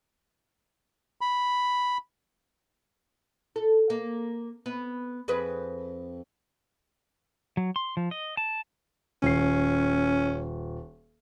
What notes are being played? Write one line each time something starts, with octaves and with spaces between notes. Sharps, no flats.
B5
A4
A#3
B3
F2 G#4 B4
F#3
C6
F3
D#5
A5
D#1 C#4 C7